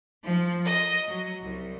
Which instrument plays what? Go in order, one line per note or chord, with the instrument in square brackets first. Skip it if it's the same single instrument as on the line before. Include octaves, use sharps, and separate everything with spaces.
[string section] F3
D#5
F#3
C2